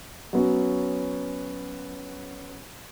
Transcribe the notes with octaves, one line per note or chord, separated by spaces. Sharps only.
F#3 B3 C#4